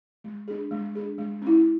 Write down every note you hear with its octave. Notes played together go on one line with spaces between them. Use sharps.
G#3
D4 G#4
G#3
D4 G#4
G#3
C#4 E4